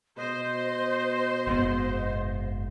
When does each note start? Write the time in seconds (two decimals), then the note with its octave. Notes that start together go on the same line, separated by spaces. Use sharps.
0.17 B2 C5 D#5
1.47 F#1 G#2 B3